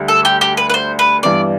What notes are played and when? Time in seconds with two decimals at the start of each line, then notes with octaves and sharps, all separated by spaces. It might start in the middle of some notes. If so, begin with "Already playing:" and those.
Already playing: D2 D3 G3
0.08 A4
0.25 G4
0.41 G4
0.57 B4
0.70 B4
0.74 C5
0.99 B4
1.23 G2 E3 B3 D5